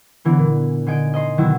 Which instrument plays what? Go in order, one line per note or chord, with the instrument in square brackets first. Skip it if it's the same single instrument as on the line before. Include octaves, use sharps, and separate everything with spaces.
[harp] D3 E3 B3
A#2
D3 D#4 D#5 G#5 D7
D#5 A#5 C6
B2 D3 D#3 F#3 E4 F#4